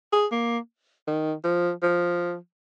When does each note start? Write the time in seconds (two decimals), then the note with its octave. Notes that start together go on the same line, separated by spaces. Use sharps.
0.13 G#4
0.32 A#3
1.07 D#3
1.44 F3
1.83 F3